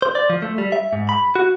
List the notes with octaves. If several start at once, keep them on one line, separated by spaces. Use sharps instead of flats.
C5
D5
F3
A3
G3
E5
G#2
B5
F#4